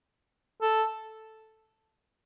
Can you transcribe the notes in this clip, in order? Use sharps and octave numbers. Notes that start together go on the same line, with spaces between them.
A4